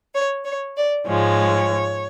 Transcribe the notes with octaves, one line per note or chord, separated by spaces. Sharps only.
C#5
C#5
D5
G#2 F3 G#3 C#5